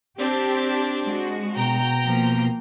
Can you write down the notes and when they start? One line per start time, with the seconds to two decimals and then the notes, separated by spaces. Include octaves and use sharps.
0.19 C4 D4 G4
1.04 G#3 F#4
1.56 B2 G5 A#5
2.04 F3 A#3